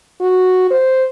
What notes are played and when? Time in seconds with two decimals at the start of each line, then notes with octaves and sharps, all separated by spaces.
0.21 F#4
0.71 C5